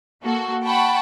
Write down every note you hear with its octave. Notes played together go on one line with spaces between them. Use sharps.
A#3 F#4 A4
F#5 G5 A5 B5 C#6